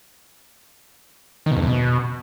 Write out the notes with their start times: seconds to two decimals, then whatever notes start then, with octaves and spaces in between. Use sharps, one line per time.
1.46 D#3
1.51 B2
1.57 F2
1.62 E2
1.67 B2